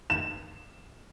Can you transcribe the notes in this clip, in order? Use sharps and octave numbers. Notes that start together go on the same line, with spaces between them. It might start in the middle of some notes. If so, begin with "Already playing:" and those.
E7